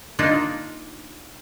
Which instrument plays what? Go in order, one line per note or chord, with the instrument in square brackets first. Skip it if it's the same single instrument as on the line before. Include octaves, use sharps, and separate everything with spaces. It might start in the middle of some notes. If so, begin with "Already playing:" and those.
[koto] A#3 D4 D#4 F4